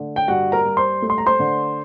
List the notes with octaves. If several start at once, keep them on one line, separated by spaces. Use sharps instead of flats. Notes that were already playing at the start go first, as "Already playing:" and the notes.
Already playing: D3 A3
G5
G2 F#4 F#5
A#4 A#5
G2
C5 C6
A3
C6
A#5
C5 C6
D3